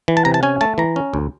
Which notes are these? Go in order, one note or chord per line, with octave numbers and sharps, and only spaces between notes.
E3
A5
C3 A#5
A5
C#4 G#5
A3 A5
E3 A#5
C#4
D2